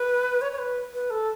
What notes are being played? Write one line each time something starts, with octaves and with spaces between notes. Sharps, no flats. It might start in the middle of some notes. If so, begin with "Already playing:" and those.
Already playing: B4
C#5
C#5
B4
B4
A4